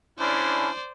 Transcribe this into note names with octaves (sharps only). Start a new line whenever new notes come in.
C#4 D4 E4 C5 D5